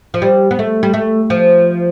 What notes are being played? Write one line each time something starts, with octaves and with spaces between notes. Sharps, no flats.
F3
G3
B3
A3
G3
A3
F3